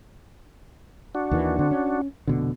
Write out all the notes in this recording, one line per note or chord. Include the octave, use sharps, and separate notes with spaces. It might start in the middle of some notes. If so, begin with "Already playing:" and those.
D4 F#4
D#2 D#3 E3
D3 C4
C#4
F1 B2 D3